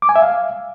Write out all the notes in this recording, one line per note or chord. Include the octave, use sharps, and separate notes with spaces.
D6
G#5
E5
F5